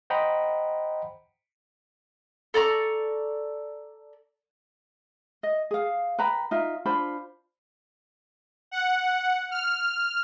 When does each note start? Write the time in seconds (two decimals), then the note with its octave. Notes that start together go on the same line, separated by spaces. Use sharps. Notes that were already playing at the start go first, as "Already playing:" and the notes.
0.10 C5 D#5 F#5 G5 A#5 B5
2.54 A4 D5 A#5 C#6
5.43 D#5
5.71 G#4 F5
6.18 B4 G5 A#5 B5
6.51 D#4 F4 E5
6.86 D4 F4 C5 B5
8.71 F#5
9.51 F6